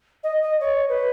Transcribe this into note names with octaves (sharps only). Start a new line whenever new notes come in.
D#5
D#5
C#5
B4